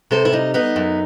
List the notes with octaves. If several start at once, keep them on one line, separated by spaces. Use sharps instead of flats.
C3 A4 C5
E4
G3 D#4
B3 D#4
F#2